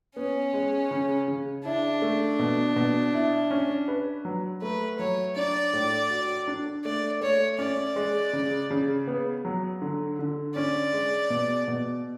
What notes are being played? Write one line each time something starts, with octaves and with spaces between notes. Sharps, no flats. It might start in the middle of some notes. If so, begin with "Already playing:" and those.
B3 C#4
G#3
C#3
C#3
D4 E4
A3
B2
B2
E4
C#4
B4
F#3
A3 B4
F#3 C#5
D4 D5
A2
F#4
D4
A3 D5
A3 C#5
C#4 D5
G#3
C#3
C#3
B3
F#3
D3
D3
C#4 D5
G#3
B2
B2